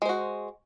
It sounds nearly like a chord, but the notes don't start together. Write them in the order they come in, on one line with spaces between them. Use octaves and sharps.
G#3 C5 F#4